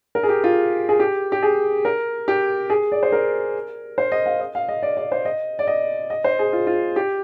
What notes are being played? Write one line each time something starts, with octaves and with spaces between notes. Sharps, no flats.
A#4
G#4
G4
F4
G#4
G4
G4
G#4
A#4
G4
G#4
D5
C5
A#4
C5
D#5
F5
D#5
F5
D#5
D5
D5
C5
D#5
D5
D#5
D#5
C5
G#4
F4
F4
G4